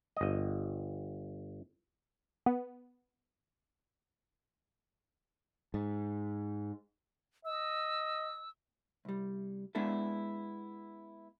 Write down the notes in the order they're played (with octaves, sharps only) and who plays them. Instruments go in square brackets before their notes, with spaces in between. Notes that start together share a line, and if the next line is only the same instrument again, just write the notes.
[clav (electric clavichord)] G1 D#5
[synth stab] B3
[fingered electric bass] G#2
[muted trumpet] D#5 [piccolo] E6
[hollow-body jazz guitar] C2 G3
G#3 B3 D4 E4 A4